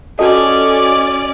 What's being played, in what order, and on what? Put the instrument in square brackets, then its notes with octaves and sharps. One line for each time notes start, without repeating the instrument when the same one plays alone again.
[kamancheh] C#4 D5 [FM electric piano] F#4 A4 D#5